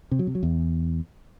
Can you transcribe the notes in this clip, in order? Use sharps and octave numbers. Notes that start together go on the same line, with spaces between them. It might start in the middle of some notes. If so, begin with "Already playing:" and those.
C3
F#3
C3
F#3
E2